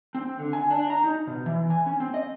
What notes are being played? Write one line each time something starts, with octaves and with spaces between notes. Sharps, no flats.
C4
D3
G#5
D4
A#5
D#4
B2
E3
G#5
C#4
C4
D#5